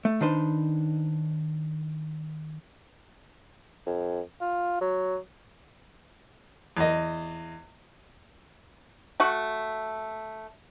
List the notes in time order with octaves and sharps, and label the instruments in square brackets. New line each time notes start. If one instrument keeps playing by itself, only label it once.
[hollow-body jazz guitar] A3
D#3 D4 D#4 B4 C5
[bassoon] F2
F4
F#3
[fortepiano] E2 D#5
[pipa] A3 F#4